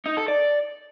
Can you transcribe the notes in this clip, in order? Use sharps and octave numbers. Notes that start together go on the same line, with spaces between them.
D#4
A4
D5